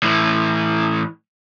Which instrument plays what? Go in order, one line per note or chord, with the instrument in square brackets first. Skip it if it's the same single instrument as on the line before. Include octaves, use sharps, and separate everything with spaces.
[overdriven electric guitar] A2 E3